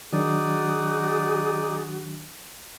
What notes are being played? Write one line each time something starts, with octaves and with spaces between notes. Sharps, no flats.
D#3 F#3 D4 D#4 F#4 G#4 D5 D#6